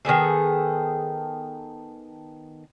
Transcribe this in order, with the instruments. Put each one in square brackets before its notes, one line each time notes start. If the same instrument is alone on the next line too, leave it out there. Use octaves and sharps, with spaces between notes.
[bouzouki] D#3 B3 G#4 A4